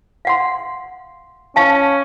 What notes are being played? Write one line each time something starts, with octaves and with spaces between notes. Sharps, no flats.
F5 F#5 C6
C#4 F5 A5